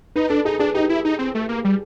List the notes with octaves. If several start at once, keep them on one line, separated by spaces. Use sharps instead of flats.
D#4 B4
D4 A4
D#4 G#4
D4 G#4
D#4 G4
E4
D#4
C4
A3
A#3
G3